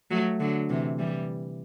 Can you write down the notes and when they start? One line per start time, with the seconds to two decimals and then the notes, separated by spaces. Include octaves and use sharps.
0.11 F#3 A3
0.40 D3 F#3
0.69 C3 E3
0.99 E3 G3